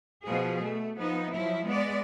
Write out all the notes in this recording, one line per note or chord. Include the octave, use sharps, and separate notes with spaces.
B2 F3 G#4
A3
F3 B3 D#4
F3 F#3 E4
G#3 B3 D5